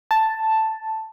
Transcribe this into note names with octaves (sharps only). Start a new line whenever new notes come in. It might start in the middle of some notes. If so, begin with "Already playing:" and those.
A5